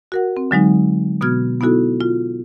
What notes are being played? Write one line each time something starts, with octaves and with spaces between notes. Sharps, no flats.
F#4 A#4 F#5
C4
D3 F#3 G#3 D#4
B2 B3 F#4 F6 G#6
B3 D#4 E4 F#4 A4
F4